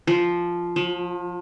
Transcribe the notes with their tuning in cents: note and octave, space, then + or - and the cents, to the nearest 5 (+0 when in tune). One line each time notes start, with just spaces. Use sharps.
F3 -5
F3 +35